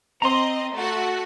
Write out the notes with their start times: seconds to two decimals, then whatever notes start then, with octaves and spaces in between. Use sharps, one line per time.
0.22 C4 D#5 A#5 C6
0.75 A3 F#4 F#5